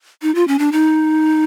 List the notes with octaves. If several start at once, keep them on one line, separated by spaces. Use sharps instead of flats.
D#4
F4
C#4
D4
D#4